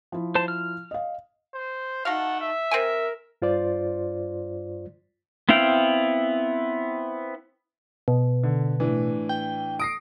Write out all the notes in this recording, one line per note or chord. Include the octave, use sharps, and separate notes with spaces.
F3 E4
C5 A5
F6
D#5 F5
C5
A3 D#4 F#4 F5 F#5 A5
E5
C4 A#4 G5 G#5
G2 F4 C5 D5
B3 C4 E4 F5 G5
B2
D3
A2 E3 D4
G5
D#6 A#6 C7 D7